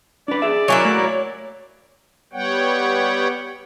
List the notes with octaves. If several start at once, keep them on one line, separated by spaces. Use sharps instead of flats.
D4 B4 D5
G#4 E5
F#3 A#3 E4 C#5 G#5
A3
C#5
G3 B3 C#5 F#5 G5